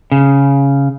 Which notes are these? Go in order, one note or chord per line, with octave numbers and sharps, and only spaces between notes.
C#3